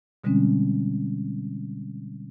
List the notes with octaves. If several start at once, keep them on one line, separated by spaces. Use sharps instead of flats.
B2 D3 G3 G#3 C4 C#4